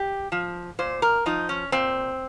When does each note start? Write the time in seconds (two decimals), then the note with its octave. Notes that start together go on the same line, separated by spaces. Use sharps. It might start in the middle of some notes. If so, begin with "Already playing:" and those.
Already playing: G4
0.32 F3
0.79 A#2 C5
1.02 A#4
1.26 F3 D#4
1.49 C#4
1.72 A#2 C4